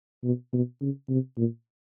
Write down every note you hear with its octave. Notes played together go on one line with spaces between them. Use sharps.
B2
B2
C#3
C3
A#2